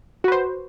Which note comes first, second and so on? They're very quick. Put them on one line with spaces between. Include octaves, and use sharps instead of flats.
F#4 B4 C5